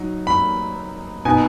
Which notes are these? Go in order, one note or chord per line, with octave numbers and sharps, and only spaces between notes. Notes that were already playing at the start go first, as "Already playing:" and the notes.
Already playing: F#3 D#4
B5
B2 B3 D#4 G#5